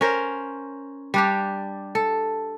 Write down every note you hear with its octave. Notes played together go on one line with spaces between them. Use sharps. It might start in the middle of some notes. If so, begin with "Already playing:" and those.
C#4 A#4 C5
G3 D4 G4
A4